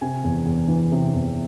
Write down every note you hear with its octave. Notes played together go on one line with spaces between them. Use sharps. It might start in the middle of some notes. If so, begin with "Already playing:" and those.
C3 G#5
E2
E2
E3
C3
E2